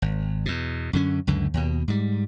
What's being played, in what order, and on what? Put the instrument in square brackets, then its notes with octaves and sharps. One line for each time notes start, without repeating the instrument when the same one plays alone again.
[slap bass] G#1
E2 B2
F#2 D3 C#4
C#2 F#2 D3
D#2 B2
G#2 G3